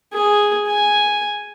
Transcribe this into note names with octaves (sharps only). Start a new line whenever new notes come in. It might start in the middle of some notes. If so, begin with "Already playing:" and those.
G#4
G#5